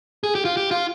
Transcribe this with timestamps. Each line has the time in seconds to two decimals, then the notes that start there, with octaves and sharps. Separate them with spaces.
0.24 G#4
0.35 G4
0.45 F4
0.57 G4
0.71 F4